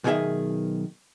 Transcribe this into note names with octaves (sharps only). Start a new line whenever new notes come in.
B1 B2 D#3 G#4 D#5 E5